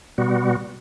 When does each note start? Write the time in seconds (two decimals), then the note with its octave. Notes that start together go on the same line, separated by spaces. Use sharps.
0.18 B2 G3 B3 F#4